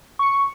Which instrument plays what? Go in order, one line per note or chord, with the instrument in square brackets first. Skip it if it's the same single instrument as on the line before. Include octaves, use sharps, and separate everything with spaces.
[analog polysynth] C#6